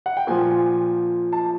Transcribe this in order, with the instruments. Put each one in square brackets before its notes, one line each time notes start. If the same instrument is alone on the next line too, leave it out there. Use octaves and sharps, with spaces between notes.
[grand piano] F#5
G5
A#2 F3 G#5
A5